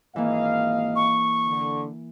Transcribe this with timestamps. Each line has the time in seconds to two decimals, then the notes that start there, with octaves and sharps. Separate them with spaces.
0.16 G#1 E3 A#3 D#5 F5
0.96 C#6
1.47 D3